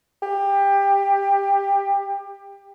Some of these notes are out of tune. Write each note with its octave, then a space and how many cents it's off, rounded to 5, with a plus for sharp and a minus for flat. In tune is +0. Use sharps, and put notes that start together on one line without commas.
G4 +20